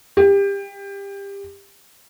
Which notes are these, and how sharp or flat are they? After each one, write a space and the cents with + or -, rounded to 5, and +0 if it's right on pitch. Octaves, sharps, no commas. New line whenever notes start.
G4 +25